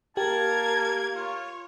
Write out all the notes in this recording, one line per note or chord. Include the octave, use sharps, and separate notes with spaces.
A#3 G4 A#4 A5 G#6
F4 C#5